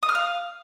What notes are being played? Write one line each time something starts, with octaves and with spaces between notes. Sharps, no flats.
D#6
F6
F5